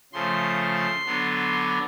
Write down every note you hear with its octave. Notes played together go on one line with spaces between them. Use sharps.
C#3 F3 A3 C6
D3 F#3 B3 D4